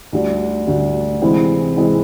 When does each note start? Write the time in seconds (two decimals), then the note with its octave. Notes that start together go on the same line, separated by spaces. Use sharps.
0.12 D2 D3 G3
0.67 D2 D3 G3
1.22 C3 E3 G#3 C4 E4
1.76 C3 E3 G#3 C4 E4